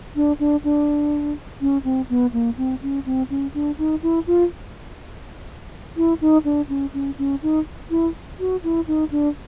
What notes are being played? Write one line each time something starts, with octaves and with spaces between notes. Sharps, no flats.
D4
D4
D4
C#4
C4
B3
A#3
C4
C#4
C4
C#4
D4
D#4
E4
F4
E4
D#4
D4
C#4
C#4
C#4
D#4
E4
F#4
E4
D#4
D4